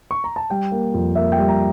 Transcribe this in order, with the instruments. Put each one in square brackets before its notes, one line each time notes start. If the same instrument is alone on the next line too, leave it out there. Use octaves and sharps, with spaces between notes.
[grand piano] C#6
A#5
A5
G3 G5
A#3
F2
A#3 E5
G5
G3
A#5